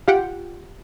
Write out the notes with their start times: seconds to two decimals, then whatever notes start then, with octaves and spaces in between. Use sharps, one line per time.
0.08 F4 G4 F#5 G5